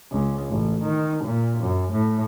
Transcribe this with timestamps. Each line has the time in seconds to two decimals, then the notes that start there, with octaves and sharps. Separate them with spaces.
0.12 C#2
0.50 A1
0.84 D#3
1.25 A#2
1.61 F#2
1.92 A2